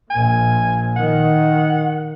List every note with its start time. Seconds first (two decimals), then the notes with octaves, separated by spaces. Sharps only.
0.10 A#1 A#2 G#5
0.96 D#3 F#5